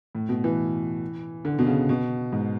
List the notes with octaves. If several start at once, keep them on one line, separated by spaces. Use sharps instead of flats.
A2
B2
E3
D3
B2
C#3
B2
G#2